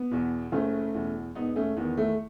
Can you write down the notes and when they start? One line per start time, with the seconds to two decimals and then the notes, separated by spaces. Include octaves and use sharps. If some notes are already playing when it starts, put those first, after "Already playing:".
Already playing: B3
0.11 E2 B2
0.52 F#1 A3 C#4
0.94 E2 B2
1.35 E1 B3 D#4
1.56 A3 C#4
1.76 E2 D#3 B3
1.97 A3